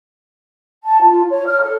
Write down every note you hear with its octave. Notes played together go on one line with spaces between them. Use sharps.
A5
F4
C#5
F6
A4